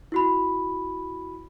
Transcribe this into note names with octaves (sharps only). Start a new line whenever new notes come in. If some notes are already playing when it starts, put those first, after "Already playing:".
E4 F#4 B5